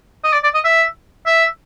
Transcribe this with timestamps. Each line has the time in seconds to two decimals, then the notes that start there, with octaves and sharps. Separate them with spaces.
0.24 D#5
0.33 D5
0.44 D5
0.54 D#5
0.65 E5
1.26 E5